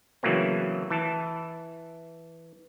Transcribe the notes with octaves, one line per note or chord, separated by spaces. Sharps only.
C#3 E3 F#3 A3 A#3 C4
E3 A5